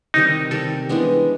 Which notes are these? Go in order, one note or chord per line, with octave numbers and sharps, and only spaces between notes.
C3 D#3 G3 D#4
C3 D#3 G3 A4
E3 G#3 B3 D4